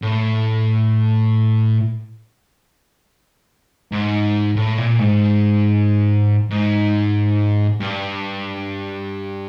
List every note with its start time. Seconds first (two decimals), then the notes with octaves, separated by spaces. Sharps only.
0.02 A2
3.92 G#2
4.57 A2
4.78 A#2
4.99 G#2
6.50 G#2
7.80 G2